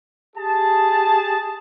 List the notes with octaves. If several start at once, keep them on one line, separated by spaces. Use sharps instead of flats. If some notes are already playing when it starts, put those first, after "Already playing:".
G4 G#4 A5